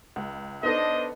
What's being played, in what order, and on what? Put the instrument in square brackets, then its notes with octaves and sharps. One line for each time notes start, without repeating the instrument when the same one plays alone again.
[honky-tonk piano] C#2
[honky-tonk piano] B3 D#4 A4 [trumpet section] D4 C5 D#5